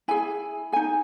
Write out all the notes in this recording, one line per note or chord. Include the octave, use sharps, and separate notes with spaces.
E4 G#4 G#5
D#4 G#4 G#5